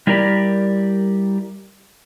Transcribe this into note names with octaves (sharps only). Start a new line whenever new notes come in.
G3 E4 G4 A#4 D5